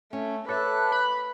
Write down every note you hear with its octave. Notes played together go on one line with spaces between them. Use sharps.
A3 C#4
A4 B4 C#5 E5 D6 F#6
B5